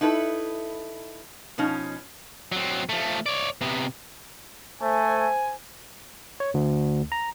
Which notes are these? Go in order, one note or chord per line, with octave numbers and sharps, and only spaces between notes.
D#4 E4 A4 B4
B2 F3 C#4 D#4
F#3 C4
F3 A3
C#5 D5
C3 B3
A3 C5 G#5
C#5
D2
A#5